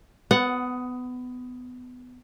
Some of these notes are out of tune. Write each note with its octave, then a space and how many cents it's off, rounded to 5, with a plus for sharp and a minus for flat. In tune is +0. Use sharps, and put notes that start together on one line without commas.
B3 +20 F#5 +0